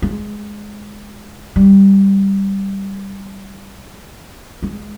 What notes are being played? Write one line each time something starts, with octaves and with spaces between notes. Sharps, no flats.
G#3
G3
G#3